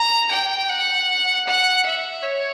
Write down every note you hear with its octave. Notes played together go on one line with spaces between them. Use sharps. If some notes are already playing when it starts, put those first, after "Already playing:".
Already playing: A#5
G5
F#5
F#5
E5
C#5